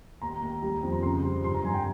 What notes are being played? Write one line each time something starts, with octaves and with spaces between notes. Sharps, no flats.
D#2 A#5
D#2
G3
F2
A#5
C#3 C6
G3
G2 C6
A#5
G2 G#5
G5